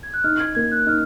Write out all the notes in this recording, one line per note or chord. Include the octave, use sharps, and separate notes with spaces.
G#6
F#6
D#4 F6
G#6
A#3 G#6
F#6
D#4 F6